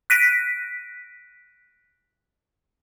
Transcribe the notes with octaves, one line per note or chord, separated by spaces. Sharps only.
F#6 A#6 B6 D7 D#7